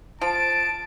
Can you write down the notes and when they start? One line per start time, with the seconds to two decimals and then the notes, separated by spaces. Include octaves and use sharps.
0.21 F3 A5 D7